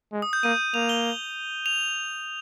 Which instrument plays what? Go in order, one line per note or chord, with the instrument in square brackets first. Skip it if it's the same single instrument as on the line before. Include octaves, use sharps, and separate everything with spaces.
[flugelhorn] G#3
[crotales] D#6
G6
[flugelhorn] A#3 [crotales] D#7
[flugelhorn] A#3 [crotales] F7
[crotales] G7
F7